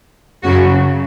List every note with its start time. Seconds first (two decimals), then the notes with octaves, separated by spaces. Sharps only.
0.43 F#2 C#3 F#3 F#4